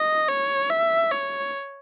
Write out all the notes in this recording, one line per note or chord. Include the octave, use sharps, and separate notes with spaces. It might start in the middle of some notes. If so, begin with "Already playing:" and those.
Already playing: D#5
C#5
E5
C#5